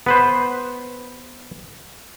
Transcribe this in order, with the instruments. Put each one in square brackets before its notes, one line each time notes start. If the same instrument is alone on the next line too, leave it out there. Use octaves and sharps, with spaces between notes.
[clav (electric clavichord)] B3 B4 C5